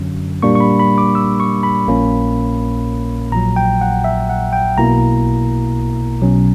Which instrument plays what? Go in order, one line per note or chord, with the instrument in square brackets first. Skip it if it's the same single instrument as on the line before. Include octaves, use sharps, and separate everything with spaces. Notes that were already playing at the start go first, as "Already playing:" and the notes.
Already playing: [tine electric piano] F#2 D3 F#3 C#4
A#2 G3 A#3 D4 C#6
C#6
B5
B5
D6
E6
C#6
B5
A#1 A#2 A#3 C#4
A#1 A#2 F#3 A#5
G5
F#5
E5
F#5
G5
B1 B2 A#3 E4 A#5
B1 B2 F#3 C#4